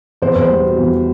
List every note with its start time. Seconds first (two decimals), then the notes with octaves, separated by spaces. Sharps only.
0.22 E2 C5
0.32 E2 B4
0.42 C5
0.50 G3
0.65 B2
0.78 E2